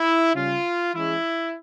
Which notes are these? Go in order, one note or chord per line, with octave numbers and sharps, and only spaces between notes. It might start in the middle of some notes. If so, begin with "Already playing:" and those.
Already playing: E4
C#3 G3 C#4 F4
E3 G#3 C#4 E4